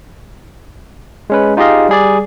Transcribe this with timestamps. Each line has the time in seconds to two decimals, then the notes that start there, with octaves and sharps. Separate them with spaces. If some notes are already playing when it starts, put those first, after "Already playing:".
1.30 G#3 C#4 B4
1.57 D#4 F4 G4 G#4 D#5 F5
1.89 G3 G#4 D5